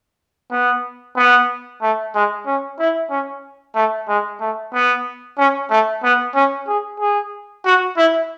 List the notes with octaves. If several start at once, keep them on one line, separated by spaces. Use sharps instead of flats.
B3
B3
A3
G#3
C#4
E4
C#4
A3
G#3
A3
B3
C#4
A3
B3
C#4
G#4
G#4
F#4
E4